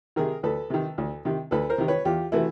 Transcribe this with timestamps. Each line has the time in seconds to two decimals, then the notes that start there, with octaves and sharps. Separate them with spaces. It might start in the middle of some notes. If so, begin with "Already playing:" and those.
0.16 C3 D#3 G#4 A#4
0.43 D2 A4 B4
0.70 C3 D#3
0.98 D2
1.25 C3 D#3
1.51 D2 A4 B4
1.70 A#4 C5
1.78 C3 D#3
1.88 B4 C#5
2.05 E2 F4 G4
2.32 C3 E3 A3 E4 F#4